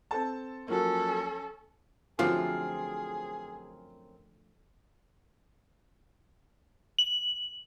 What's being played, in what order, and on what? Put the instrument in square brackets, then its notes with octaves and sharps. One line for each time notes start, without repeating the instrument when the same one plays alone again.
[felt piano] C4 A4 A5
[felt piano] F3 F#3 A#3 [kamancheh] C#4 A4
[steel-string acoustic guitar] F#2 C4 [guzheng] D3 F3 A3 [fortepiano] F4 [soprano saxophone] G#4
[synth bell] F#7